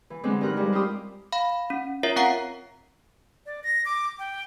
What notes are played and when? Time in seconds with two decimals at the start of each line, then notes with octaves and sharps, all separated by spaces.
0.10 E3
0.24 D3 E3 F#3 G#3 C4 D4
0.41 G2 D#4 A#4 B5 F#6
0.57 F3 G3 G#3
0.72 E4 F4 G4 G5 C6 D#6
1.32 F5 B5
1.70 C#4
2.03 F4 A#4 C#5 E5
2.16 C4 F5 F#5 A#5 C7
3.46 D5
3.64 A#6
3.85 D6
4.19 G5